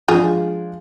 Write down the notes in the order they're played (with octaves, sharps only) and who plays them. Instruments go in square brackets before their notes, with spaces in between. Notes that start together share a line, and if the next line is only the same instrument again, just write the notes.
[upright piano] F3 G#3 D4 [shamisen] F4 G#4